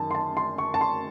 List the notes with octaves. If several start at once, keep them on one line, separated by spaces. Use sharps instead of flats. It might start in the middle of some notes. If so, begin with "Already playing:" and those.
Already playing: F#2 D#3 A5
C6
A5
C6
C#6
A5
C6